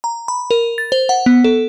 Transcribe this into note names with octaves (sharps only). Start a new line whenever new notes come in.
A#5
B5
A#4
A6
C5
F#5
B3
A4